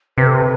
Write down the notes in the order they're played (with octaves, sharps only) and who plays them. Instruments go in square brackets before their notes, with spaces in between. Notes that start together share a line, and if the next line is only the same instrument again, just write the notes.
[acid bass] C3 [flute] B4
[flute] A4
B4